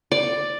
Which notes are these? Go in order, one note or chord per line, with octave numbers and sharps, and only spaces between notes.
D5